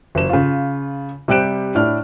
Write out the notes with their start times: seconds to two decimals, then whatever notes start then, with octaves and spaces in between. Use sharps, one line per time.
0.15 F#1 E7
0.29 C#3 F4
1.28 C3 G3 G5 F#6 D7 E7
1.75 A2 D4 E4 F6